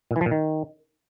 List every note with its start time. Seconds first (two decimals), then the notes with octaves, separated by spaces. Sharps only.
0.11 A#2
0.16 E3
0.21 F3
0.26 A#2
0.31 D#3